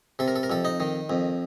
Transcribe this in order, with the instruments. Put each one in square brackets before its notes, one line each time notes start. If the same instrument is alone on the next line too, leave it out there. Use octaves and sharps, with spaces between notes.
[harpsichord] C3 A4
A#4
A4
A#4
F2 A4
D#4
D#3
F2